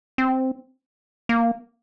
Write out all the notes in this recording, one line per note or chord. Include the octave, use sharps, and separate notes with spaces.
C4
A#3